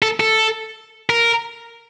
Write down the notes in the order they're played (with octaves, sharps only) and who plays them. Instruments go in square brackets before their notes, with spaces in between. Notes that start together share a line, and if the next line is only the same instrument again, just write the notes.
[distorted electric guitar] A4
A4
A#4